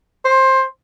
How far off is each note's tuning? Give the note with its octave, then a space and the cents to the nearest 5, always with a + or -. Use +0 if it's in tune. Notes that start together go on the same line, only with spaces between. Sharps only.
C5 +15